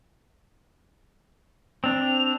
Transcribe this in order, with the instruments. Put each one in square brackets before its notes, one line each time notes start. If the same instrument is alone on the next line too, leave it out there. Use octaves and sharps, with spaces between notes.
[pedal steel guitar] C4 D4 [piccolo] F7